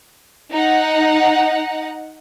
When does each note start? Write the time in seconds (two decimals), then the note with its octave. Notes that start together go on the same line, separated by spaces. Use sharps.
0.51 D#4 F#5